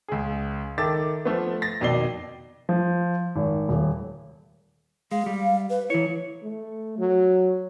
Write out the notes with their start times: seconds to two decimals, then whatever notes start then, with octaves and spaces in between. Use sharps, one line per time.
0.08 C#2 G#4
0.78 D#3 A4 E5 D6 A6
1.25 F3 A3 B3
1.62 A6 A#6
1.81 F2 B2 D#3 D5 C7 G7
2.69 F3
3.36 G#1
3.69 D#1
5.11 G#3 F5
5.26 G3
5.70 B4
5.90 E3 E4 C#5
6.43 A3
6.98 F#3